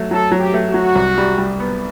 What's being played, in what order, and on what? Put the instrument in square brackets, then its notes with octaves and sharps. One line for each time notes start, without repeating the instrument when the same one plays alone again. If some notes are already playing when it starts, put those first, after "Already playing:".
Already playing: [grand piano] F#3 A3
[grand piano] F#3 [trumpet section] A4
[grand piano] F#3
[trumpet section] G4
[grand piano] A3
[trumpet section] F#4
[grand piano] F#3
C2
G3
G3
B3